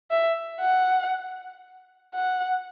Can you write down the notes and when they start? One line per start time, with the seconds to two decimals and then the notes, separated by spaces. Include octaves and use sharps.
0.11 E5
0.61 F#5
2.14 F#5